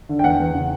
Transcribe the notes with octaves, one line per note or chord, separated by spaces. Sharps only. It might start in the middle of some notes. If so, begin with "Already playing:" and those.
D3
G5
E2 F#5
E2
C#3